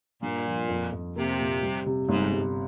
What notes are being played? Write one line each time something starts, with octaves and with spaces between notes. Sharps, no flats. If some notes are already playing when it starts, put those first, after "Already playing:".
G2 A#2
F3
F2
F2
C3 A#3
A#2
G3
C3
G1 G#2
G3